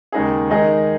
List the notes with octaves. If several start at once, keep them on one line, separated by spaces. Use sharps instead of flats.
D#2 C#3 G#3 D#4 G#4
D#3 G#3 D#4 G#4 D#5